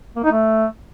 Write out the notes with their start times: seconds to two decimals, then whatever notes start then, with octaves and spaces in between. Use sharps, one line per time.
0.16 A#3
0.24 D#4
0.32 A3